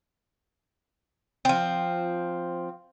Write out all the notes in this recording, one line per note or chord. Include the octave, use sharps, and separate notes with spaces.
F3 C4